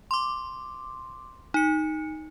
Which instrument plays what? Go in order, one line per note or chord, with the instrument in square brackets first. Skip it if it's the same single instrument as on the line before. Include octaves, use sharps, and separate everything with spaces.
[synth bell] C6 D6
D#4 C#7